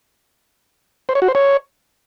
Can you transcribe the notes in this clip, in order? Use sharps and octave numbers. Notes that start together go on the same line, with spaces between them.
C5
C#5
F#4
C5
C#5